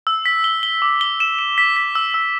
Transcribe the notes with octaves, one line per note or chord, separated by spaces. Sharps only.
E6
B6
G7
G7
D6
G7
E7
E7
B6
B6
E6
E6